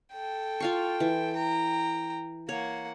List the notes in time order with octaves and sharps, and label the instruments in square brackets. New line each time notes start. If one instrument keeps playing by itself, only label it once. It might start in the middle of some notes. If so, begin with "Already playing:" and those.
[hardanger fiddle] A4 G5
[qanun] F4 F5 C#6
E3
[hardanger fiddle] G5 A#5
[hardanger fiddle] A#3 F#5 [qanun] C#5